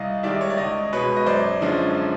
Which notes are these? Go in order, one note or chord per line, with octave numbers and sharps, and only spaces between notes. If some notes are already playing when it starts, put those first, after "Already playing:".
Already playing: C2 D#5 F5
C3 D#3 G#3 D5 E5
C#5
D5
C#2 C#5 D#5
B2 G#3 B4 C#5
D#5
F#2 C5 D5
D3 F3 G#3 C#4